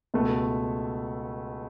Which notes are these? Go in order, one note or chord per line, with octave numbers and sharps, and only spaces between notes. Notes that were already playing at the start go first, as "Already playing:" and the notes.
C#2 B2 A3